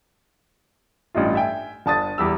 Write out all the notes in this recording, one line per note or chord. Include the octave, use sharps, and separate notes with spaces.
A1 G2 D#4 F4
E5 G5 G#5
G1 A5 D#6 A6
E2 G3 E6